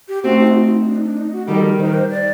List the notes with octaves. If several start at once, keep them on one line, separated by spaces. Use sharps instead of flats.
G4
A3 C4 F#4
D#4
F#4
D#4
F#4
D#4
D4
D#4
D4
D#4
F#4
D#3 G3 A4
A#4
D#3 C5
A#4
C5
D5